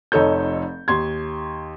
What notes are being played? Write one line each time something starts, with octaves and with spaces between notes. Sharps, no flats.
F1 F2 D#4 A4 C#5 G6
D#2 C6 G#6